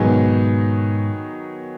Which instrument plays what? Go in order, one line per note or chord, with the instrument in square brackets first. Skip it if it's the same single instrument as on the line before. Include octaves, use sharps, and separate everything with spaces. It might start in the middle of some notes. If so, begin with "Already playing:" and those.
Already playing: [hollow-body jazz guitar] G#2 B2 [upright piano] D#3 F#3 B3 D#4 G#4